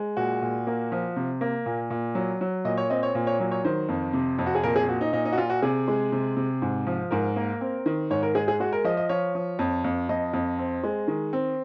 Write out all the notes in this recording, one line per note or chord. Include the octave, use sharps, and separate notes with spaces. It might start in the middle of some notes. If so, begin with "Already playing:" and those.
Already playing: G#3
A#2 F#4
A#2
A#3
F3
C3
A#3
A#2
A#2
F#3
F#3
A#2 D#5
C#5
C4 D#5
C#5
A#2
C#5
F#3
C#5
D#3 C5
F2
C3
F2
F#4
G#4
A#2 A#4
G#4
A#2 F#4
D#4
A#2 D#4
D#4
F#4
A#2 F4
F#4
C3 G#4
G#3
C3
C3
G#2
F3
G#2 A#4
A#3
C4
D#3
G#2 C#5
A#4
G#3 G#4
G#4
G#3 F#4
A#4
F3 D#5
D#5
F3 C#5
F3
F2
F2
F2 D#5
F2
C4
G#3
D#3
C4